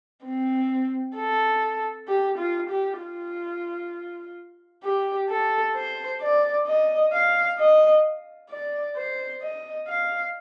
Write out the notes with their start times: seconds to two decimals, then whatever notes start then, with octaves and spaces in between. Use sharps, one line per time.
0.25 C4
1.17 A4
2.08 G4
2.39 F4
2.70 G4
3.01 F4
4.84 G4
5.29 A4
5.76 C5
6.21 D5
6.67 D#5
7.12 F5
7.59 D#5
8.50 D5
8.96 C5
9.42 D#5
9.88 F5